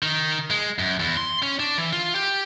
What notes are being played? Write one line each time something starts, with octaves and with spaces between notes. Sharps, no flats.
D#3
G#3
F#2
E2
C6
C#4
D4
E3
F4
G4